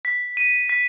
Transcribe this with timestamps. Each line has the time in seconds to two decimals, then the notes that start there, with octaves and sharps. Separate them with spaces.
0.05 B6
0.37 D#7
0.69 B6